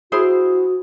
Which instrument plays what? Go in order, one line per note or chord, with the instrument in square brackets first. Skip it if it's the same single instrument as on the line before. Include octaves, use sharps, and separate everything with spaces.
[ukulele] E4 G#4 C5 [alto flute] F#4